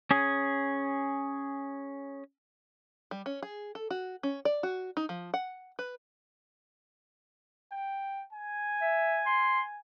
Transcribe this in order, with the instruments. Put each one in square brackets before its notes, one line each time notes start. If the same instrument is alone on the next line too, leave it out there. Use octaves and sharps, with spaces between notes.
[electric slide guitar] C#4 G#4
[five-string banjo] G3
C#4
G#4
A4
F#4
C#4
D5
F#4
D#4
F3
F#5
B4
[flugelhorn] G5
G#5
[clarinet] E5
C6